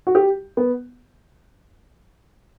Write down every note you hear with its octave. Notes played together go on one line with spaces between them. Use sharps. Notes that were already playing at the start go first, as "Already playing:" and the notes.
F#4
G4
B3